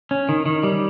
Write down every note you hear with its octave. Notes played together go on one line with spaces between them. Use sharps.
C#4
D#3
D#3
G3